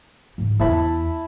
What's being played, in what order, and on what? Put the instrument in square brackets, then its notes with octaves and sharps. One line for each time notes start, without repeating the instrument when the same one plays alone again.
[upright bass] G#2 E3
[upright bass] E2 [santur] E4 A5 B5